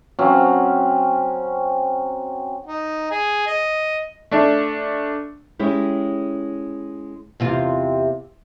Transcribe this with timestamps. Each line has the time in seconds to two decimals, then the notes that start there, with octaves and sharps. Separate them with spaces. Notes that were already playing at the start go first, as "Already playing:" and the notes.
0.19 F#3 C4 C#4
2.67 D#4
3.11 G#4
3.47 D#5
4.31 A3 D4
5.59 G#3 C#4 E4 G4
7.40 E2 C3 F4